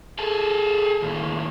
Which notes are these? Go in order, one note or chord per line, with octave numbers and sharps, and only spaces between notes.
G#4 A4
D#2 A2